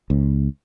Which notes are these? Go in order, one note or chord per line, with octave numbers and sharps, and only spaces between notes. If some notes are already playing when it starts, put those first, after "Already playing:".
C#2